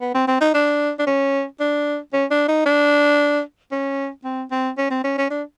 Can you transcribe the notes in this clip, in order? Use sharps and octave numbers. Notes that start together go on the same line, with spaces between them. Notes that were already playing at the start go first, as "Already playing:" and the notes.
B3
C4
C4
D#4
D4
D4
C#4
D4
C#4
D4
D#4
D4
C#4
C4
C4
C#4
C4
C#4
C#4
D4